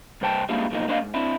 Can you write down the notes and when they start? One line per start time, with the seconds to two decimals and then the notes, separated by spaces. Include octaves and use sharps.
0.21 G2 C3 C5 G5 A5
0.49 G3 G#3 A#3 D4 E4 F4
0.71 B1 B2 F3 G#3 A#3 D#4
0.88 A#3 D4 C5 D#5 F5
1.01 G#2
1.14 C4 D4 E4